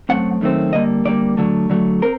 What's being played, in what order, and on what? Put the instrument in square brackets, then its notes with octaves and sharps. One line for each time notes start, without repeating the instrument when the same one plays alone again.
[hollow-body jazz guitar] F#2 D#3 A3 C4 F#5
F#2 D#3 A3 C4
D3 G3 A#3 D#5
D3 G3 A#3 D5
D3 F#3 A3
D3 F#3 A3
C4 A#4